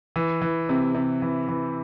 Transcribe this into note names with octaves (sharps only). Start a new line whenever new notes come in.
E3
E3
C3
C3
E3
E3